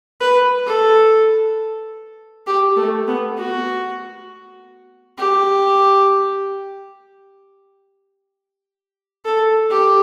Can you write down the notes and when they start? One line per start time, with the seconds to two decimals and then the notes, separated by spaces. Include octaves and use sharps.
0.20 B4
0.66 A4
2.47 G4
2.77 A3
3.07 B3
3.37 F#4
5.18 G4
9.25 A4
9.70 G4